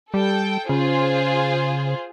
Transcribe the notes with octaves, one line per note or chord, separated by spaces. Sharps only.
G3 A4 G5
C#3 F4 G#4 C5